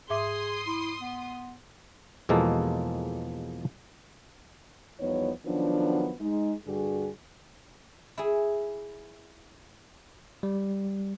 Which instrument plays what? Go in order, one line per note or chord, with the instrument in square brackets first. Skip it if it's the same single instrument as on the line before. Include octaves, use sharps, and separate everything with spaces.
[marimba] G#2 E5 D6 [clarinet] G#4 [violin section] C6 D#6
[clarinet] E4
B3
[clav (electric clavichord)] E2 B2 F3 G#3 A#3 A4
[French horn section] E2 F3 G3 B3 D#4 C#5
D#3 F3 F#3 B3 C#4 D4
G#3 D#4
G2 D3 G3 F#4 G#4
[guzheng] E4 G#4
[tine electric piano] G3